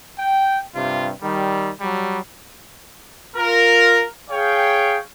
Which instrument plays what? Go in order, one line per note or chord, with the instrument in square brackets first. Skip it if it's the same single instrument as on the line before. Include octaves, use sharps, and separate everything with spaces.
[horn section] G5
G2 C3 F4
D#3 G3
F#3 G3
[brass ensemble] F4 A#4
G#4 C#5 F5 G5